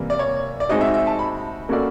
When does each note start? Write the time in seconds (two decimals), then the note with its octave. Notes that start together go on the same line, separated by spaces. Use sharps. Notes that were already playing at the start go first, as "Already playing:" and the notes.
Already playing: C3 E3 G3 A#3
0.10 D5
0.19 C#5
0.60 D5
0.69 G#3 C4 D#4 F#4 D#5
0.81 E5
0.94 E5
1.07 A5
1.19 B5
1.69 A#3 C#4 F#4 A4 D5